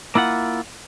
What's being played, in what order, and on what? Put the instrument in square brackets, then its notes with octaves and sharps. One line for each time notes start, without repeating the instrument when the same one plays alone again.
[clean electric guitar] A#3 E4 F4 F#5